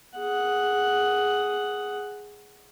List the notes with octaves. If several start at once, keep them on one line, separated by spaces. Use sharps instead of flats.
G#4 F#5